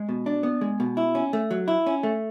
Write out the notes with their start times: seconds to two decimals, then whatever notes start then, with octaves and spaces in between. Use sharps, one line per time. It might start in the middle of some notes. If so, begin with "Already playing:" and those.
Already playing: G#3
0.09 B2
0.26 D4
0.43 B3
0.61 G#3
0.80 B2
0.97 E4
1.15 C#4
1.33 A3
1.51 F#3
1.68 E4
1.86 C#4
2.03 A3